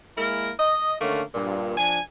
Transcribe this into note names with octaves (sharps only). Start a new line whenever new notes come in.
G#3 A#3 E4 A#4
D#5
D3 D#3 A3 A#3 C#4
G2 A#2
F3 D4 G#5